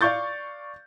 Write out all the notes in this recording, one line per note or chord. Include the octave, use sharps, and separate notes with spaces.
D5 F5 C#6 G6 A6